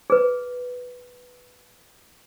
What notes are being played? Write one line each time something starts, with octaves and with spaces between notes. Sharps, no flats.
G#4 B4